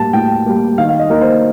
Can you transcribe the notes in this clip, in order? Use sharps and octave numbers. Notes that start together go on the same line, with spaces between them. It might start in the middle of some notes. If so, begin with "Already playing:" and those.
Already playing: A2 G3 A#3 A5
A2 G5
G3 A#3
D#3 F5
F5
D#5
A#3 D#4 A#4
C5